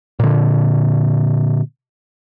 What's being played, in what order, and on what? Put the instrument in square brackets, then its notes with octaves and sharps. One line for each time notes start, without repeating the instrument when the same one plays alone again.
[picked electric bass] A#2 D3